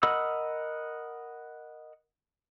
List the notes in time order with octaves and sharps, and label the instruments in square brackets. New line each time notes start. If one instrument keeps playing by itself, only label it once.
[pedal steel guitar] A#4 D#5 F#5 B5 E6